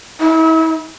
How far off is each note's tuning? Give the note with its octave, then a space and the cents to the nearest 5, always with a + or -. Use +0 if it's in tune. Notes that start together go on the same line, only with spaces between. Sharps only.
E4 -40